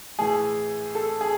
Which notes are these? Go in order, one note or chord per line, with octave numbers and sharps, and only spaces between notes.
A2 E3 G#4
A4
G#4